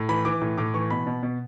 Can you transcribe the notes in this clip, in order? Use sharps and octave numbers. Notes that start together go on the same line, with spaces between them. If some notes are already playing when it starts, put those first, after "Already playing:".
Already playing: A2
E3 B5
E3 D6
A2
A2 D6
E3 C#6
B2 B5
B2
B2